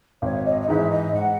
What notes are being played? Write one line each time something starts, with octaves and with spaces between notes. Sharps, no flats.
G#1 C#5
D#5
D#5
G#2 E3 G#3 D#4 E5
D#5
G#2 F#5